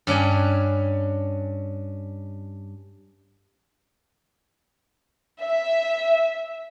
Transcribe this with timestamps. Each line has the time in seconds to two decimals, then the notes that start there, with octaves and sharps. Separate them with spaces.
0.07 G2 C#4 D4 G#5
5.40 E5